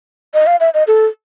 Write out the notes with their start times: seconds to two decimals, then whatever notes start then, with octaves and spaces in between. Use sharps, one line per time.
0.34 D#5
0.47 F5
0.60 E5
0.74 D#5
0.87 A4